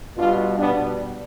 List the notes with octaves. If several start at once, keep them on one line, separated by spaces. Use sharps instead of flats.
B2 G3 D4 F4
B2 G3 B3 D4